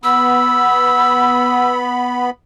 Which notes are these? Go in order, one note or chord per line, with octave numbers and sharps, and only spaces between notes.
B3 B5 E6